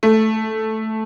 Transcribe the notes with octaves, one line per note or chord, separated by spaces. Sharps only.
A3